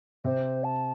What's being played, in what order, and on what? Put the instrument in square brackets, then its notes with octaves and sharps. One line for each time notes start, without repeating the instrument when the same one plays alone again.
[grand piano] C3 C4 [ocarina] C5
[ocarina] A5